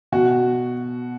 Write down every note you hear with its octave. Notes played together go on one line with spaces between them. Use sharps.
B2 F#4